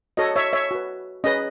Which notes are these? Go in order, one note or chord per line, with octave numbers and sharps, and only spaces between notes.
F#4 A4 C#5 D#5
C#5 E5
C#5 E5
F#4 B4
C#4 G#4 B4 D#5